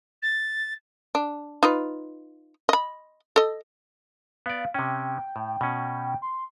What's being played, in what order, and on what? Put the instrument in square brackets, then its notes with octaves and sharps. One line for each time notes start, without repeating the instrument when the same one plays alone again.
[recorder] A6
[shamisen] D4
D#4 F4 B4
D#5 B5
A4 D#5
[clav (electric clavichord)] B3 D5 [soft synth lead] F5
[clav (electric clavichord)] C3 C#4 [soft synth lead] G5
[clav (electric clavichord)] A2
B2 C#4
[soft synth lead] C6